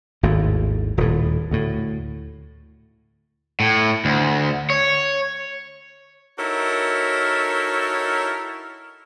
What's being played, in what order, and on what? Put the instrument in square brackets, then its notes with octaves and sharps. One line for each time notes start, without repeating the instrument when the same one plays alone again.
[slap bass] G#1 D#2 A2
D#1 A2
D2 A2
[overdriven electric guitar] A2
D2
C#5
[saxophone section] D#4 E4 F#4 A4 A#4 C#5